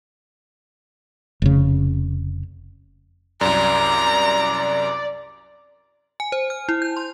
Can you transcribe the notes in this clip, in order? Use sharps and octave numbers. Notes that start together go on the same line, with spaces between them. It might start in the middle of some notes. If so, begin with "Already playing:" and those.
F1 C#3
C2 F#2 D5 A#5
G#5
C5
F6
E4
G6
C6